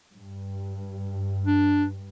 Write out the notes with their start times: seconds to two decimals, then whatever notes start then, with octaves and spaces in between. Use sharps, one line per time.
0.12 G2
1.46 D4